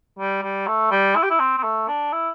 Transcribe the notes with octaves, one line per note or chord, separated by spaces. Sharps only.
G3
G3
A3
G3
E4
G4
E4
C4
C4
A3
D4
E4